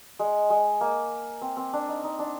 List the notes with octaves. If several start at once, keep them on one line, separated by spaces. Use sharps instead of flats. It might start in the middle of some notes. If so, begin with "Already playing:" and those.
G#3
G#3
A#3
C4
C4
D4
D#4
D#4
D4